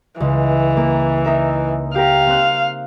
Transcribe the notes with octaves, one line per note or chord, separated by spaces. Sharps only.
C#2 E3
A#3
D#4 A#4 E5
G4 A#4 F5
C4 F#6